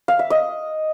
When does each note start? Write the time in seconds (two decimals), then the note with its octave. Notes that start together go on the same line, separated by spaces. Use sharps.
0.08 F5
0.19 E5
0.30 D#5